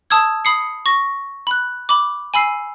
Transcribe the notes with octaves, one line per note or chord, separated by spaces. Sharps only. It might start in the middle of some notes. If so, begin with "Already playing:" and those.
A5 D#6 E6 G#6
B5 D#6 C7 C#7
C#6 A#6
B5 F#6
B5 D6
G#5 B5 E6 C7